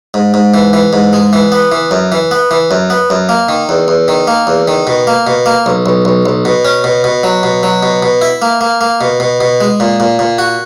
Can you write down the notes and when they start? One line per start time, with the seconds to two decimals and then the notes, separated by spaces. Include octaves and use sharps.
0.14 G#2
0.34 G#2
0.54 E3
0.73 E3
0.93 G#2
1.13 G#3
1.33 E3
1.52 B3
1.72 E3
1.91 F#2
2.12 E3
2.31 B3
2.51 E3
2.71 F#2
2.90 B3
3.10 F#2
3.29 A#3
3.49 D#3
3.69 E2
3.88 E2
4.08 D#3
4.27 A#3
4.47 E2
4.68 D#3
4.87 B2
5.07 A#3
5.27 B2
5.46 A#3
5.66 B1
5.86 B1
6.05 B1
6.26 B1
6.45 B2
6.65 C#4
6.84 B2
7.04 B2
7.23 F#3
7.43 B2
7.63 F#3
7.83 B2
8.03 B2
8.21 E4
8.42 A#3
8.61 A#3
8.81 A#3
9.01 B2
9.20 B2
9.41 B2
9.61 G#3
9.80 A#2
10.00 A#2
10.19 A#2
10.38 F#4